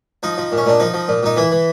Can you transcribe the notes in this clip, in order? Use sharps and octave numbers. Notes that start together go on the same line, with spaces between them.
F3 D#4
F3
A#2
C#4
A#2 D4
F3 D#4
F3
A#2
A#2 D#4
E3 E4
E3